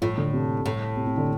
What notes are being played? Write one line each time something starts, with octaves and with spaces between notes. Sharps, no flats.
A2 F3
D3
C3
A2
C3
C3
D3